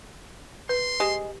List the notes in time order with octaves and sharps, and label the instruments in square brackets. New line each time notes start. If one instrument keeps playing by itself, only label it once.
[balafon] B4 [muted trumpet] C6
[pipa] G#3 [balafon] G4